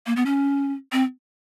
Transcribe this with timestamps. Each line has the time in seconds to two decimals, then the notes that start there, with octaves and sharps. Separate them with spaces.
0.06 A#3
0.16 B3
0.26 C#4
0.92 C4